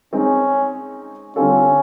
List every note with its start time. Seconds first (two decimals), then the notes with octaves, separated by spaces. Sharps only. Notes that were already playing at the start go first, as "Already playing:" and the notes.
0.13 G#3 C4 C#4 D#4 G#4
1.36 D3 G3 C4 C#4 F4 A4